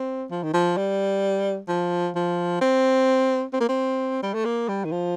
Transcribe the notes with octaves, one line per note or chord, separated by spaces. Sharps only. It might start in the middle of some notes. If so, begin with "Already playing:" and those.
Already playing: C4
F3
D#3
F3
G3
F3
F3
C4
C4
A#3
C4
G3
A3
A#3
G3
D#3
F3